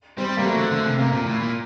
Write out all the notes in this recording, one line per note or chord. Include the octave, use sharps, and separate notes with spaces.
G3 C4
G3 A#3
F#3 A3
D3
D3 A3
C3
C3 A#3
A#2
A2
A#2